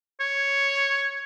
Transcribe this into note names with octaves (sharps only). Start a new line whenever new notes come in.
C#5